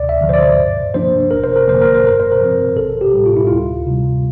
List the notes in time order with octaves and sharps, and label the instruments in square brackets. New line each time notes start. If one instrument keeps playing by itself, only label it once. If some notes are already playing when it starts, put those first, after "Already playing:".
Already playing: [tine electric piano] D2 D5
E5
D3 F3
C5
D5
G2
F3 A#3 D4 C5
G1 A#4
C5
A#4
F2 D3 F3 A#3 C5
A#4
C5
G2 A#4
C5
A#4
F3 C4
A1 A4
G4
A2 G3
F4
E4
D2 F4
C3 G3